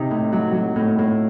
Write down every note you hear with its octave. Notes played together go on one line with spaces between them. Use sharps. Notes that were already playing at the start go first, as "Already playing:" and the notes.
Already playing: C3 D#4
A2
F#3
F#3
A2
A2